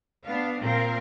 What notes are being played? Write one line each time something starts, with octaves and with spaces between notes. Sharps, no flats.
B3 D4 F5
A#2 C4 A#4 F5